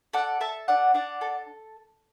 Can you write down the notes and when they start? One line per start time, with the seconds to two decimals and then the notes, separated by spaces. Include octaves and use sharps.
0.13 A4 D5 F#5
0.40 A4 E5 A5
0.68 D4 D5 F#5
0.94 D4 D5 F#5
1.21 A4